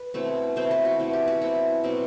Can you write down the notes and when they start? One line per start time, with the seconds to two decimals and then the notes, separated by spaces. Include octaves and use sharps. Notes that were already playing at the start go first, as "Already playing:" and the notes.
Already playing: B4
0.14 B2 A3 C4 E4
0.56 B2 A3 C4 E4 C5
0.71 B4
0.85 F#4
0.99 B2 A3 C4 E4
1.13 G4
1.28 F#4
1.41 B2 F#3 C4 E4
1.84 B2 F#3 C4